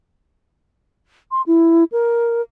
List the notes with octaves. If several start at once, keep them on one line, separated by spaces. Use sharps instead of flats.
C6
E4
A#4